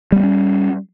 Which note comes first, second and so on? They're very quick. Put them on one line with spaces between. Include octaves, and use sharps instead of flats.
G3 B3 A#3 C#4